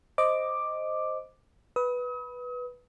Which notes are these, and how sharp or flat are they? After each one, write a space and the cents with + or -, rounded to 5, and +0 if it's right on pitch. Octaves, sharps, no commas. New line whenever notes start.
C5 +0 D#5 +0 D6 +5
B4 -5 D#6 +40